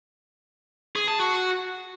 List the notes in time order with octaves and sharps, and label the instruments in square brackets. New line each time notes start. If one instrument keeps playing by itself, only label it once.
[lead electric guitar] G#4
A5
F#4